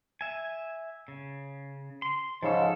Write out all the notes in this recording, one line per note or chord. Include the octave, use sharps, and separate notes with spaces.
E5 G#5
C#3
C6
G#2 C#3 F3 A4